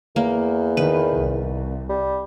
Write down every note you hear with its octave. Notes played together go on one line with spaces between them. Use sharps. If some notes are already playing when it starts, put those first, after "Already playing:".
E2 A#3
D#3 B4
C2
G3